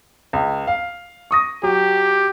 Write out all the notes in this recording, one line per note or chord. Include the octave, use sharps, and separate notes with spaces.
C#2
F5
C#6 D#6 A#6
F#3 G4